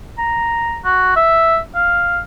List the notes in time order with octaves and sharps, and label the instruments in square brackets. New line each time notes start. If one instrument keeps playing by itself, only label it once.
[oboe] A#5
F#4
E5
F5